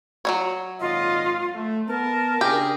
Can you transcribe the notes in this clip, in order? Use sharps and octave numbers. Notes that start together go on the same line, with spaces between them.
F#3 C#4 C#5
G#1 A#2 F4 D#5
A3
B3 A#4 A5
C#3 D4 G4 G#4